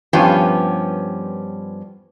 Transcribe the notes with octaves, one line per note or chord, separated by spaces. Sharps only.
G2 F3 B3 C#4 G4